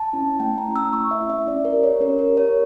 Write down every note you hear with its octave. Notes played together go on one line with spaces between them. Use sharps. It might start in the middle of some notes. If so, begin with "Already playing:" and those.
Already playing: A5
C#4 E4
A3 G5
A#5
C#4 E4
E6
A3 C#6
E5
C#4 E4
E5
C#4 D5
A#4
G4
C#5
C#4 A#4
A#4
G4
C#5